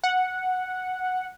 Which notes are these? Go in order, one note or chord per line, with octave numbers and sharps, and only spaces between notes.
F#5